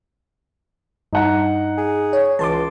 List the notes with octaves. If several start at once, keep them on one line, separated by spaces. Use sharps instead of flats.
G2 D#4 F#5 A#5
G#4
C#5
C#2 E3 A5 C6 D6